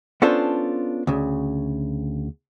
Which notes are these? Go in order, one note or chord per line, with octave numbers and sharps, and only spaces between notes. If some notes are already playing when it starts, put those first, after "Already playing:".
B3 C#4 D4 F4 A4 C5
D2 C#3